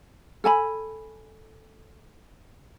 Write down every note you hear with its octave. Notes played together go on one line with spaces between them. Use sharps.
A4 G#5 A5 B5